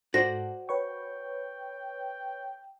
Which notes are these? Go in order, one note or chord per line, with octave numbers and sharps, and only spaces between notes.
G#2 F#4 A4 C5 D5 F#5 A#6
B4 C#5 G5 C#6